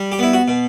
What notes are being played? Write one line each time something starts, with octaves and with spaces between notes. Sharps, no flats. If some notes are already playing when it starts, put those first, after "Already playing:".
Already playing: G3
G4
B3 E4
F#4
B2